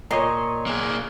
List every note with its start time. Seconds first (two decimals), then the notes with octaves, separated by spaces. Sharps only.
0.11 A#2 A#4 C#5 D#5 C6
0.66 A#3 G#4